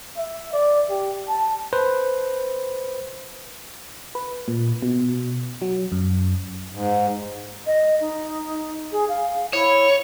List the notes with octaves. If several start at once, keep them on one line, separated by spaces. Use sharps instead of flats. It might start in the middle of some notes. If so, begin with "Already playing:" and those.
E5
D5
G4
A5
B4 C5
B4
A#2
B2
F#3
F#2
G#2
D#5
D#4
G#4
F5
E4 C#5